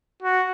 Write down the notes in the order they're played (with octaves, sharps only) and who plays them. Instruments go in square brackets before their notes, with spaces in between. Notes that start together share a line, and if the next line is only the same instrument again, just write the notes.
[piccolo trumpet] F#4